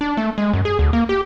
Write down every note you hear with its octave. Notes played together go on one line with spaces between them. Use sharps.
D4
A3
G#3
F#2
G#4
D2
A#3
G4